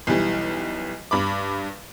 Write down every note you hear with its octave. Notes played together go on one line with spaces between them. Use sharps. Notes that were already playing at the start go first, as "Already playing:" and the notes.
B1 E3 G3
G2 B5 D6